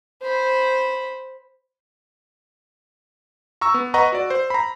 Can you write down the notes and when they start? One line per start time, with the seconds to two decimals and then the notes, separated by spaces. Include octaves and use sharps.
0.22 C5 B5
3.61 A#5 C#6 E6
3.74 B3
3.94 B4 D#5 F#5 A#5 C#6
4.12 F#4 D5
4.30 C5
4.50 A#5 B5